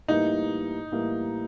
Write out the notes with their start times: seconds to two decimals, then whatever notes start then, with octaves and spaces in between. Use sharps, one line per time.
0.08 A2 E3 G3 A#3 D#4
0.92 A2 E3 G3 A#3